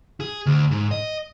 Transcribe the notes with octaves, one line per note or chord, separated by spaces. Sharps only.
G#4
D2
G#2
D#5